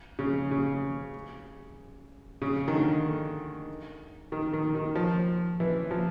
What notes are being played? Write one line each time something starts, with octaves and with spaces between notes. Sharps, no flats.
C#3
C#3
C#3
D#3
D3
D#3
D#3
D#3
F3
E3
F3